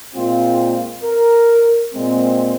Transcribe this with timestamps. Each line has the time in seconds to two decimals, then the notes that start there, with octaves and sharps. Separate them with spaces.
0.15 A#2 G#3 C4 F4
1.04 A#4
1.94 A#2 G#3 C4